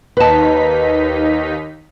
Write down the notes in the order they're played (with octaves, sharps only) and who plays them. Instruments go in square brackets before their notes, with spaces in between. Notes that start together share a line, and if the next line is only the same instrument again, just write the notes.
[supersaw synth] D#2 D#4 B6 [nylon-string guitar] B4 A5